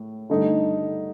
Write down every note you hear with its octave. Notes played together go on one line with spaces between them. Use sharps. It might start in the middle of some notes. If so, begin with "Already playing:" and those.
Already playing: A2
G2 D3 A3 D#4